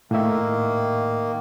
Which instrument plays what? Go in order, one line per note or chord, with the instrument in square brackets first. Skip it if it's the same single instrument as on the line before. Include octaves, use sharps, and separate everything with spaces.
[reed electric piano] A2 E5 [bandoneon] D#3 A#3